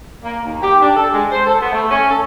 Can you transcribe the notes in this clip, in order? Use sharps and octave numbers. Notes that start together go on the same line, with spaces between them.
A#3
D#2
G4
D4
A4
G#3
C5
A4
B3
A3
C#4
A4